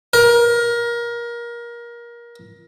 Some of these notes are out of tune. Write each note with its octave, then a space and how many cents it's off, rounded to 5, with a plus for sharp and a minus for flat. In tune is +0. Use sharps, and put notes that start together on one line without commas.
A#4 +25